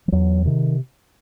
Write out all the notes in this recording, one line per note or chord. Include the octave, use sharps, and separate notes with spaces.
F3
E2 F#3
C3 D#3